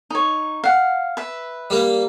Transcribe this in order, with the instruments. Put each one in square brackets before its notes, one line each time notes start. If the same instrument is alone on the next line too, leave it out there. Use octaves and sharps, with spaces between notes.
[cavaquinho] D#4 C#5
F5 F#5
B4 E5
[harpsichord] G3 A#3